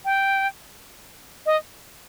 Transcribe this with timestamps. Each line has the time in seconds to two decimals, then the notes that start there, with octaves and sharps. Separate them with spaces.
0.05 G5
1.46 D#5